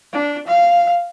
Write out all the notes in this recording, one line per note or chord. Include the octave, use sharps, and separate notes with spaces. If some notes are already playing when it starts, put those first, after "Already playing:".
D4
F5